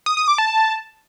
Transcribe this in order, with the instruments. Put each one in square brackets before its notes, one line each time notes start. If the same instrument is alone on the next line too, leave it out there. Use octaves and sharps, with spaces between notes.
[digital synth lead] D#6
D#6
D6
A5